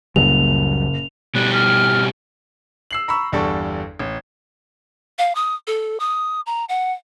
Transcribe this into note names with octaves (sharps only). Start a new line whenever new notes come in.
F#1 C#2 A#2 F#3 G3 F7
B2 G3 F#6
F6
E6 C7 F#7
A#5 B5 C#6 E6
G1 E2 G3 D4 A4 C#6
A1
F5
D#6
A4
D#6
A#5
F#5